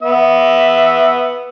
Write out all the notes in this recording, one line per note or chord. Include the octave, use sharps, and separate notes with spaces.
B3 E5